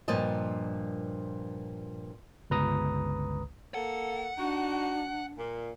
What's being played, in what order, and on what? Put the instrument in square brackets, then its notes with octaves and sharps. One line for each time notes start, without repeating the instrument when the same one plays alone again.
[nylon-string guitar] G2 A#2 F3 A#4 D#5 A5
[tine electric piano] G1 C#2 B4 A#5 D#6
[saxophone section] A#3 A4 [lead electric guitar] F#5
[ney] D4 [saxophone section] D#4 F#4
[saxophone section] A#2